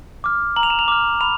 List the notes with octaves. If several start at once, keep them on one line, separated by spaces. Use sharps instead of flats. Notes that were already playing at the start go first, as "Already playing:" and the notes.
D6 F6
A#5 F#7
F7
E7
F7
D6 F6
B5 F7